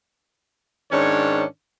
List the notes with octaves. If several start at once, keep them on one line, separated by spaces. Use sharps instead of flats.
G#2 D#3 C#4 D4 C#5